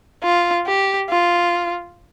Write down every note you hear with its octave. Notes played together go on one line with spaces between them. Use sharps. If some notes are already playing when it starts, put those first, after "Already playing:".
F4
G4
F4